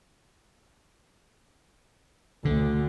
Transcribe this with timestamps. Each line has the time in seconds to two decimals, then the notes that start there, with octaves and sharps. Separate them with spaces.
2.45 D2 D3